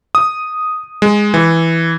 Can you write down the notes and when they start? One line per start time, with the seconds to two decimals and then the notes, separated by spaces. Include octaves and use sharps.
0.15 D#6
1.02 G#3
1.34 E3